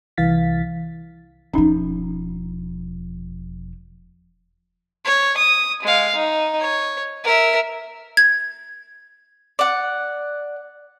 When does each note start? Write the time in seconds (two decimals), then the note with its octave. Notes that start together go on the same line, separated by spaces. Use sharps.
0.17 C2 E3 F5 A6 B6
1.54 E1 F3 C#4 D#4
5.05 C#5
5.37 D#6
5.82 G#3 F5
6.15 D#4
6.60 C#5
7.24 A#4 E5
8.17 G#6
9.59 D5 F#5